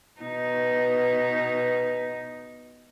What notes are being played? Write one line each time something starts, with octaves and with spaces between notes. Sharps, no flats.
B2 B3 D#4